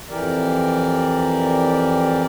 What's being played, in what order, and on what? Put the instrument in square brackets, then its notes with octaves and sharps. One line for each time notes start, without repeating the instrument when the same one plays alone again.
[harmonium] F2 E3 G4 A#4 D5